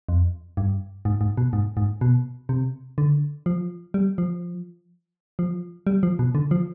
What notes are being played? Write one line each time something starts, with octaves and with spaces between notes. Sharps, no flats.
F2
G2
G#2
G#2
B2
G#2
G#2
B2
C3
D3
F3
G3
F3
F3
G3
F3
B2
D3
F3